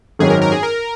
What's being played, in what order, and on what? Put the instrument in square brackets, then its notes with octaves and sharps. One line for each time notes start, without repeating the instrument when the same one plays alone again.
[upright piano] G#1 F#2 D#3 F#3 C#4 [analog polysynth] G#4
[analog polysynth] A#4
A#4
G#4
A#4